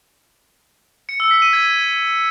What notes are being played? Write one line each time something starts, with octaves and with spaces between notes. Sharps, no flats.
C#7
E6
B6
D#7
G#6